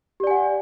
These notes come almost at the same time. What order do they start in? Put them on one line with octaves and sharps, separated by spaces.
G4 D5 G#5 F#5